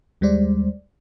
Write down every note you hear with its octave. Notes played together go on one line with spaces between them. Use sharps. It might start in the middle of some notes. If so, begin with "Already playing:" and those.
D#2 G3 G#3 C5 D5